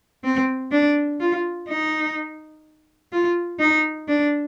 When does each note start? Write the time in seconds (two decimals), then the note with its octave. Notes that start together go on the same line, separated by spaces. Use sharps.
0.24 C4
0.72 D4
1.20 F4
1.68 D#4
3.12 F4
3.60 D#4
4.08 D4